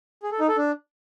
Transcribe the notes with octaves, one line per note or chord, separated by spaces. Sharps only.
G#4
A4
D#4
A4
D4